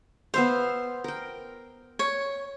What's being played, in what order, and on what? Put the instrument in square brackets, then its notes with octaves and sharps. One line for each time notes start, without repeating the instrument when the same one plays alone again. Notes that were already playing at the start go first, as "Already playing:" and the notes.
[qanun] B3 E5 F5 [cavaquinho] C5
[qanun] A#4 G5
[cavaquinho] C#5